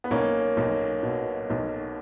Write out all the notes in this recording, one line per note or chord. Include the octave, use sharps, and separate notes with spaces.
B3
B1 A#3 C#4
B1
B2
B1